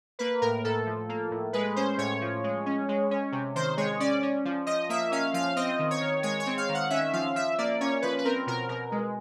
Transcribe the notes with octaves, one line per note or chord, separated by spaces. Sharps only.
A#3 B4
A2 A#4
A2 A4
F3
A#3
A2
G#3 B4
C#4 C5
A2 C#5
F3
G#3
C#4
G#3
C#4
C3
D#3 C5
G#3 C#5
C#4 D5
C#4
F3
F3 D#5
A#3 E5
C#4 F5
F3 F5
C4 D#5
D#3
C#5
D#3
G#3 C#5
C#5
C4
F5
D#3
F#5
C#4 E5
F3 F5
F3 E5
A#3 D5
C#4 C#5
F3 B4
B4
C4 A#4
B2 A#4
B2 A#4
G#3